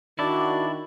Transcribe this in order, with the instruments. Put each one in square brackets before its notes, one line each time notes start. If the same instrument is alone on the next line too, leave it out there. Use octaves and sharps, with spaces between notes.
[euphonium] D#3 [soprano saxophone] D4 [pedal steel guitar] E4 D5 [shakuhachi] F#4